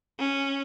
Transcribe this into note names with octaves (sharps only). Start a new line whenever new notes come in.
C#4